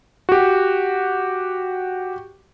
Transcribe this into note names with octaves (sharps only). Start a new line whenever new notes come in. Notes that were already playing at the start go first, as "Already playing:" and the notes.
F#4 G4